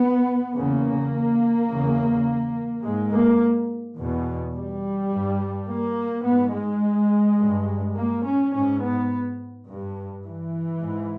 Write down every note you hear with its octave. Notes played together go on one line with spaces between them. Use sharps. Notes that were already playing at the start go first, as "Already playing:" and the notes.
Already playing: B3
E2 C#3 A#3
E2 C#3
G#2 G#3
A#3
E2 B2
G3
G2
A#3
G#2 B3
G#3
G2
A#3
C#4
G#2 C#4
B3
G2
E3
G#2